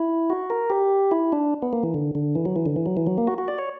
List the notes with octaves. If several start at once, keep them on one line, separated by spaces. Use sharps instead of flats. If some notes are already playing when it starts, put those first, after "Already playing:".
Already playing: E4
F#4
A#4
G4
E4
D4
B3
A#3
E3
D3
D3
E3
F#3
E3
D3
E3
F#3
E3
F#3
A#3
F#4
F#4
D5
C#5